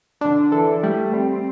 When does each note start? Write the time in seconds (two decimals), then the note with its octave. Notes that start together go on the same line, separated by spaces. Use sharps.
0.21 D3 D4
0.52 E3 A4
0.83 G3 A3
1.14 G3 C4